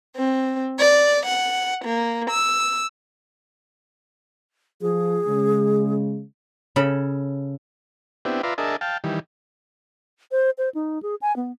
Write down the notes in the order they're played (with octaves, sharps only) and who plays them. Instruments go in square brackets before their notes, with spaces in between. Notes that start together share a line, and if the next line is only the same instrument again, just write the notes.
[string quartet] C4
D5
F#5
A#3
E6
[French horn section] F3 [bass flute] G#4
[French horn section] C#3 G#3
[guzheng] C#3 A4 B5
[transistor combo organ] B3 C4 D4 E4 G4
F4 B4 D5 E5 A#5 C6
D4 G#4 A#4 D#5 E5 A5
F5 G5 A5
D#3 E3 G3
[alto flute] C5
C5
D#4
G#4
G#5
B3